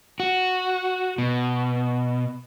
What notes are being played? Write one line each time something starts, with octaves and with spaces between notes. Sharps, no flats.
F#4
B2